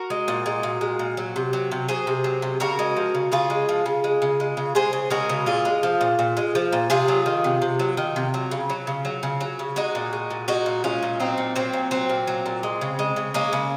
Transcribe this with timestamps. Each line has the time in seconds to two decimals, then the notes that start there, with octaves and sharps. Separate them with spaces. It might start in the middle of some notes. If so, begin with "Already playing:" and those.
Already playing: F#4 A#4
0.10 G#3
0.28 A#2
0.46 G#3
0.63 A#2
0.81 G#3
0.99 A#2
1.17 F#3
1.36 C3
1.53 F#3
1.71 C3
1.88 F#3 G#4 C5
2.07 C3
2.24 F#3
2.42 C3
2.60 C#3 F#4 A#4
2.79 G#3
2.96 F3
3.15 C#3
3.32 C#3 F4 G#4
3.50 G#3
3.69 F3
3.86 C#3
4.04 G#3
4.22 C#3
4.40 G#3
4.57 C#3
4.75 G#3 G#4 C5
4.93 C#3
5.10 G#3 F#4 A#4
5.29 C#3
5.46 A#2 F4 G#4
5.65 G#3
5.83 F3
6.01 A#2
6.19 A#2
6.37 G#3
6.55 F3
6.72 A#2
6.90 C3 F4 G#4
7.08 F#3
7.26 D#3
7.44 C3
7.62 C3
7.80 F#3
7.97 D#3
8.16 C3
8.34 F#3
8.51 C#3
8.70 F#3
8.87 C#3
9.05 F#3
9.23 C#3
9.41 F#3
9.59 C#3
9.76 G#3 D#4 F#4
9.95 A#2
10.13 G#3
10.30 A#2
10.48 G#3 D#4 F#4
10.66 A#2
10.84 G#3 C#4 F4
11.03 A#2
11.20 F#3 C4 D#4
11.38 A#2
11.56 F#3 C4
11.73 A#2
11.91 F#3 C4
12.09 A#2
12.27 F#3
12.46 A#2
12.63 G#3
12.81 C#3
12.99 G#3
13.16 C#3
13.34 G#3 A#3 C#4
13.53 C#3